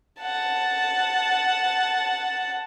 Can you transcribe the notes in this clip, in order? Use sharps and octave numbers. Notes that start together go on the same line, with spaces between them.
F#5 A5